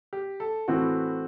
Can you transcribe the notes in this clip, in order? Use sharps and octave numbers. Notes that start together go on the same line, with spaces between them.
G4
A4
A2 E3 A3 C4 F#4